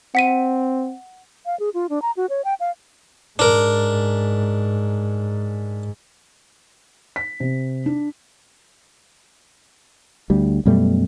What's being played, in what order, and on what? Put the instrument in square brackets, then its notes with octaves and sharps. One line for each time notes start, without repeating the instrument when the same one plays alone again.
[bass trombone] C4 [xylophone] F#5 B6 D#7
[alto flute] F5
G#4
F4
D4
A#5
F#4
C#5
G5
F5
[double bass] G#2 [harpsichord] D4 A#4
[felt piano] B6
C3
D4
[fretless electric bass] D2 G3
F#2 B2 G3 A3